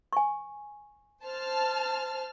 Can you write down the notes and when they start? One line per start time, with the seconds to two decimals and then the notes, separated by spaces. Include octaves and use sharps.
0.13 G#5 C#6
1.25 C5 A5 F6